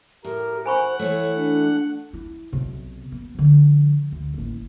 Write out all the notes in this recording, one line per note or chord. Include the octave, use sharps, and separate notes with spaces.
A2 G4 A#4
C5 F#5 G#5 B5 C#6
E3 A3 C#5
D4
E4
B1 C3
B3
D3 F3
D2
A1 D#2